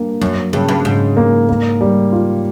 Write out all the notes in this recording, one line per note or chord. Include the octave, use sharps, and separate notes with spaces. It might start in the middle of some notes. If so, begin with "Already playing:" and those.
Already playing: G2 A#3
F#2 F#3
G2 C#3
G2
G#2 C#3
A#3
A#3
G3
F4